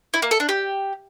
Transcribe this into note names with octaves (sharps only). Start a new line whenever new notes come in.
E4
A#3
A4
D4
G4